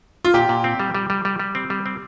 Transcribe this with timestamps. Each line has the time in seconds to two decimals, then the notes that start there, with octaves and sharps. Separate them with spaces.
0.25 F4
0.34 A#2 G4
0.49 A#2
0.64 C4
0.80 G3
0.95 G3
1.10 G3
1.25 G3
1.40 G3
1.55 C4
1.70 G3
1.86 C4